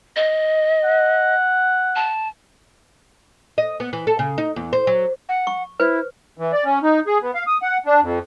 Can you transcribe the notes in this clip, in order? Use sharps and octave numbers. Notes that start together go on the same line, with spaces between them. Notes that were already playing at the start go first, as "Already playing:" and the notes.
D#5
F#5
A5
D#5
B3
E3
A4
C#3
D#4
E2
C5
F#3
F#5
C#6
E4 B4 C5
E3
D5
C#4
D#4
G#4
B3
F5
D#6
F#5
D4
F2